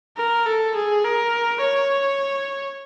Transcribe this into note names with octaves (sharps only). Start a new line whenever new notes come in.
A#4
A4
G#4
A#4
C#5